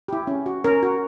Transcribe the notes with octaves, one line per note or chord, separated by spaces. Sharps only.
E4 G4
C#4
F#4
C#4 A#4
F#4